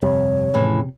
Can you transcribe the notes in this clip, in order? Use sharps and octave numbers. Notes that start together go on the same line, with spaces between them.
G1 F2 C3 G3 C#5
F2 A2 C#3 E3